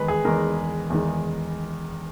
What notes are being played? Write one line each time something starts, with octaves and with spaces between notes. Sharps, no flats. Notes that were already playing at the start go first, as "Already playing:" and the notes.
Already playing: E2 D#3 G#3 B4
G#4
E2 D#3 G#3 A#4
E2 D#3 G#3